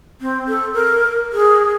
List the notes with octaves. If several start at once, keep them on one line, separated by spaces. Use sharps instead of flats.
C4
A4
A#4
G#4